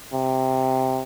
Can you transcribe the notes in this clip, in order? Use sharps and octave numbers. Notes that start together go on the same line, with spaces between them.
C3